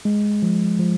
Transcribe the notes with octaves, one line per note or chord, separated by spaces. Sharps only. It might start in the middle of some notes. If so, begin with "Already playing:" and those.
G#3
F3
F3